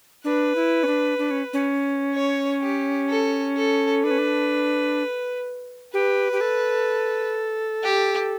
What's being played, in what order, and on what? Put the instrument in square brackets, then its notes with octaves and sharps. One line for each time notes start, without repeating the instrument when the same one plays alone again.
[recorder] D4 [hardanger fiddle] B4
[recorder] E4
C#4
D4
D4
C#4
C#4
[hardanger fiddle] C#5
G4
A4
A4
[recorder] D4 [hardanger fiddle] B4
[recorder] C#4
D4
[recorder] G4 [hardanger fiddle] B4
[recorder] G4
A4
[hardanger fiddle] G4